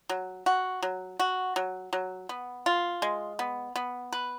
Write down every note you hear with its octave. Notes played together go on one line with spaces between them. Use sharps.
F#3
F#4
F#3
F#4
F#3
F#3
B3
F4
G#3
B3
B3
B4